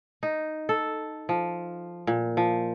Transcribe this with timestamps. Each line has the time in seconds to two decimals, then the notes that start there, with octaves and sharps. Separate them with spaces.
0.23 D#4
0.69 A4
1.29 F3
2.07 A#2
2.37 F3